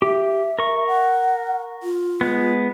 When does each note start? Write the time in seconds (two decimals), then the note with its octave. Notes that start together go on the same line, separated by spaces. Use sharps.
0.02 G4 E5
0.59 A#4 C#6
0.87 F#5
1.83 F4
2.21 G#3 B3